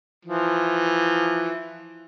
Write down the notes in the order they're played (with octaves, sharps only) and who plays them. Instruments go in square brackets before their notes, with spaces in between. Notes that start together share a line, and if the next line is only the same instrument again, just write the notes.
[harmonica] E3 F3